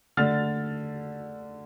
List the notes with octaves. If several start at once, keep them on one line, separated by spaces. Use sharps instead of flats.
D3 A3 F6 A6